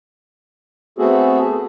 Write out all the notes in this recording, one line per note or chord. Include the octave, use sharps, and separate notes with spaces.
A3 B3 C4 F#4 G#4 A4